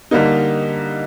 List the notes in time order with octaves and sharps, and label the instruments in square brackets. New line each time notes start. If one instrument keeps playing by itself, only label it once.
[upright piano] D3 G3 A#3 D#4